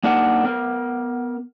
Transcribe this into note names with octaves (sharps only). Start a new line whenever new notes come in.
A#3 D4 D#4 A#4 F#5
B3 A#4